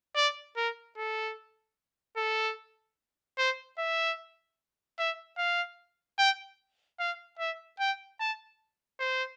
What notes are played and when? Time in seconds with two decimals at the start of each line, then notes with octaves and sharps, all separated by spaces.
0.16 D5
0.57 A#4
0.97 A4
2.17 A4
3.38 C5
3.79 E5
4.99 E5
5.38 F5
6.19 G5
7.00 F5
7.39 E5
7.80 G5
8.20 A5
9.00 C5